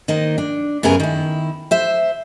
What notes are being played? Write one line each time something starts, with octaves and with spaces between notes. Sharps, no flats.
D#3 A#3 D#4 C5
D4
F#2 C#3 B3 G#4 A#4 G#5
D#3 E4
C5 E5